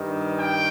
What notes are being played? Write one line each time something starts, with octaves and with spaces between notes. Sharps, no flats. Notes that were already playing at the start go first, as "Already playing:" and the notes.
Already playing: G2 D#3
G5